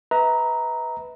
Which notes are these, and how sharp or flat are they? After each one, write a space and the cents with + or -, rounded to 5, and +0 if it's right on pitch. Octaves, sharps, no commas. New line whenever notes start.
B4 +0 E5 -45 A#5 +0